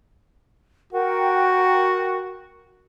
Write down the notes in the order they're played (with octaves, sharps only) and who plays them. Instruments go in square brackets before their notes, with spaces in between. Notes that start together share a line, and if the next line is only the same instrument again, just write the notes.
[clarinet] F#4 [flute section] A#4 F#5 G5